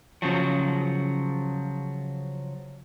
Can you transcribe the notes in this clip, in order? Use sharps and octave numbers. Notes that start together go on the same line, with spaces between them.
C#3 F3 F#3